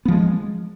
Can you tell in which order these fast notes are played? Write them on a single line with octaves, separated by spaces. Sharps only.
B3 F3 G#3